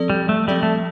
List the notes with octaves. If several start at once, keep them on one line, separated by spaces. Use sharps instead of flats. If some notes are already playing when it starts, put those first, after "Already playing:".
Already playing: F3 C4 A4 D5
G3
A3
F3 G3 C4 A4 D5
A3